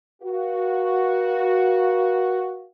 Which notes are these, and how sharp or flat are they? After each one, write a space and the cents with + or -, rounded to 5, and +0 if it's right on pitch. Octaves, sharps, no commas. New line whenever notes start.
F#4 +0 A#4 +45 F5 +0